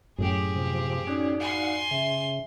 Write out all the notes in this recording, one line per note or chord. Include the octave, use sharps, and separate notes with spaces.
F#2 A2 F#3 G4 G#4
C3 F3
C#4 D#4 F#4 D5
F5 F#5 G#5 C6
C#3 E5